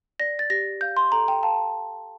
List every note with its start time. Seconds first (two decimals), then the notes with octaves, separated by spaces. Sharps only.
0.20 D5 A#6
0.39 A6
0.50 G4 A#6
0.81 F5 G6
0.97 C6
1.12 A4 A#5
1.28 G5
1.43 F5 A5